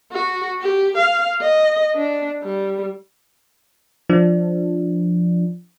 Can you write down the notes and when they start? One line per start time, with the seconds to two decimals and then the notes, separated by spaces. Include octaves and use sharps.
0.12 F#4
0.61 G4
0.97 F5
1.41 D#5
1.96 D4
2.43 G3
4.10 F3 D4